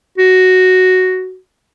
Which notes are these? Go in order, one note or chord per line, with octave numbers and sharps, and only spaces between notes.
F#4